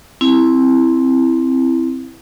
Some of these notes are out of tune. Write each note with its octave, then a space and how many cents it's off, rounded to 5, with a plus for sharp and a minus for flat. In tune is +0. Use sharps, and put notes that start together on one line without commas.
C4 +0 E4 +0